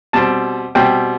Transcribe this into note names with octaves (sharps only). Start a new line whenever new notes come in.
B2 G3 C4 A5
B2 G3 C4 G5